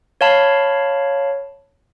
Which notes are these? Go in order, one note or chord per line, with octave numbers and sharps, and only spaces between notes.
C#5 F5 A5 B5